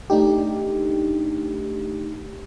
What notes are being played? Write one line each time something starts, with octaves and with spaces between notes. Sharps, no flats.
A3 D4 D#4 G4